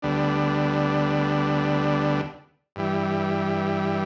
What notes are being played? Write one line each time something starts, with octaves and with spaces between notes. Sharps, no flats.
D2 D3 G3 B3 D4
G2 E3 G3